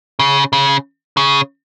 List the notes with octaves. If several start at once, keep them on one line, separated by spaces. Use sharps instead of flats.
C#3
C#3
C#3